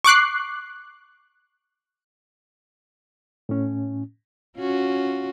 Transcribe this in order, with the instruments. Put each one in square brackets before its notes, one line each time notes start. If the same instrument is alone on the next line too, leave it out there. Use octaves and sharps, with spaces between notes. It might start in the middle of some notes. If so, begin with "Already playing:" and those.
[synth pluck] C#6 D6 F#6 C7
[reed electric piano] A2 C#4
[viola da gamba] C#4 F4 F#4